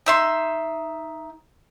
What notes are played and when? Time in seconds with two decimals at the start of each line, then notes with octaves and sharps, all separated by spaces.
0.06 D#4 E5 C6